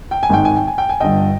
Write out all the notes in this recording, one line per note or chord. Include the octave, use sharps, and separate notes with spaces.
G5
G#5
G#1 G#2 D#3 G5
G#5
G5
G#5
G5
G#5
G1 G2 D3 D#5 G5